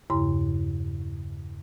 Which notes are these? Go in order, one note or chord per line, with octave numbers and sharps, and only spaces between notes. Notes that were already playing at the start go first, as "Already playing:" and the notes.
E2 G2 C#3 E4 C6